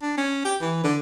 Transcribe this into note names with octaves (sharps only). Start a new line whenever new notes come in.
D4
C#4
G4
E3
D3